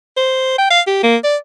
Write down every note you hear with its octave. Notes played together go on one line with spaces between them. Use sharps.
C5
G5
F5
G4
A#3
D5